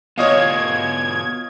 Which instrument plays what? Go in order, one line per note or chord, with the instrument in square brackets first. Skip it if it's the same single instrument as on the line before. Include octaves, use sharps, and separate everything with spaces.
[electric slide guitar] B3 F4 F#4 [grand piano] C#5 D#5 F5 [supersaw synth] G#6